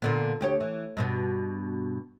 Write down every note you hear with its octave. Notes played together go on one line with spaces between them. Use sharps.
A#2 D3 B3
D2 G4 C#5
E3
G2 B2 B3